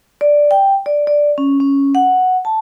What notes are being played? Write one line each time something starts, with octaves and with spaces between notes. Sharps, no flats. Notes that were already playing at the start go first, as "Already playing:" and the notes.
D5
G5
D5
D5
C#4
C#4
F#5
A5